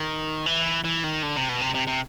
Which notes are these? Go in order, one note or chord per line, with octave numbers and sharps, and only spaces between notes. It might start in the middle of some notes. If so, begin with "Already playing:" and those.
Already playing: D#3
E3
E3
D#3
D3
C3
B2
C3
C3
C3